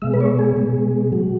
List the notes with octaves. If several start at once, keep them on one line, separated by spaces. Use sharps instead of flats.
B2 G#3 E5
B4
C#5
G#4
B2 G#3
F#3